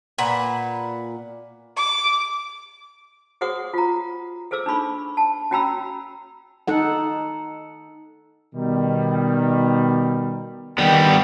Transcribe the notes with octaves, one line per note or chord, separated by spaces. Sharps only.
A#2 B4 F#5
D6
F#4 G#4 C5 F#5 C#6 D#6
F4 A#5
G#4 A4 C5 D6 E6
D4 D#4 B5 C#6
A5
C#4 F#4 G5 A#5 B5 E6
D#4 A4 F#5
B2 D#3 G3
D#3 G3 B3 G5